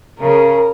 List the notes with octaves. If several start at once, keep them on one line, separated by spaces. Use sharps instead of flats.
C#3 A#4